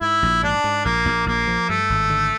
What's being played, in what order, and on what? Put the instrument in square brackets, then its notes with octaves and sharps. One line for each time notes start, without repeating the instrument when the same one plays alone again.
[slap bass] G#2 [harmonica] E4
[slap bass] A#1
[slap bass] G#2 [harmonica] D4
[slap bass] G#2
[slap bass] A#1 [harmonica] A#3
[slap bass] A#1
[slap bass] A#1 [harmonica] A#3
[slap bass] F3
[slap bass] G2 [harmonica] A3
[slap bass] G#1
D3